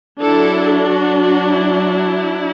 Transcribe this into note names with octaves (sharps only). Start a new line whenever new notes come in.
F#3 D4 E4 A4
F#4
F#4
E4